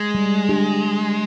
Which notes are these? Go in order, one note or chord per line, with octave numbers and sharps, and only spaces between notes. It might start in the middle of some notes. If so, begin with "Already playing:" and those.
Already playing: G#3
G3
D4 G4